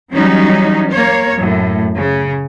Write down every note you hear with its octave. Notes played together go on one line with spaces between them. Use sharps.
E3 F#3 G3 C#4 D#4
A#3 C#5
F#2 A2
C#3